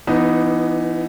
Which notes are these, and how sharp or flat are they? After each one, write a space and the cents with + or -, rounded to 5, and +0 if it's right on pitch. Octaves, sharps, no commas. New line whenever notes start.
E3 +25 B3 +0 D#4 +0